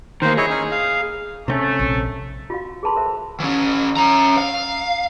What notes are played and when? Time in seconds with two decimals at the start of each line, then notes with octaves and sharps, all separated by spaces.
0.22 D#3 A#3 C5
0.37 E4 G#4 C#5 D#5
0.50 C#4 D#4
0.72 F5
1.48 C3 A3 C4 C#4
1.79 A#1
2.50 F4 F#4 F5
2.83 G#4 A4 B4 A5 B5 C6
2.96 A#4 C5 E5
3.40 E3 C#4
3.97 C#4 A#5
4.37 F5